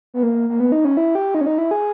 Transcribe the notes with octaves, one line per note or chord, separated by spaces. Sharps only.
B3
A#3
A#3
B3
D#4
C#4
E4
G4
D#4
C#4
D#4
E4
G#4